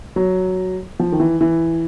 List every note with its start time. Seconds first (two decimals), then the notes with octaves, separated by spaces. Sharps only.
0.16 F#3
1.00 F3
1.12 D#3
1.20 E3
1.41 E3